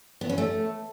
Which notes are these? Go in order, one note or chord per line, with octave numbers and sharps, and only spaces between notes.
B3
C#4
A3